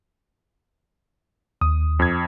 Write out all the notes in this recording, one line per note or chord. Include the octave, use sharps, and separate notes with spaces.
D#2 D#6
F2 G#6